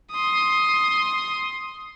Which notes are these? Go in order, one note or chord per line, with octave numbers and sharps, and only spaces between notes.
C6 D#6